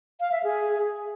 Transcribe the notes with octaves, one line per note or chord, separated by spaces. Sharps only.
F5
E5
G#4